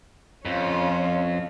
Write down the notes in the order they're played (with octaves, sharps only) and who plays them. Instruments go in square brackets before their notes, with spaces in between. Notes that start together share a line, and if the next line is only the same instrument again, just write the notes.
[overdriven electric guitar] F2 [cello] C#4 F4